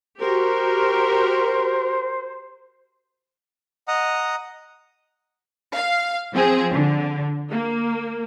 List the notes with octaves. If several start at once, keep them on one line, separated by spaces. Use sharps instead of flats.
F#4 G4 A#4 C5
D#5 F#5 A#5 D#6
F5
F3 C4 G#4
D3
A#3